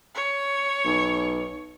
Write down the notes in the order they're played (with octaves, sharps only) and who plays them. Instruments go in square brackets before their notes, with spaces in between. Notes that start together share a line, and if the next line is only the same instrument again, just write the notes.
[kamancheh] C#5
[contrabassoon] B1